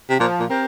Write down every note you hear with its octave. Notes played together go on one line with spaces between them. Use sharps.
C3
A#2 F3
A#2
C4 G4 A#4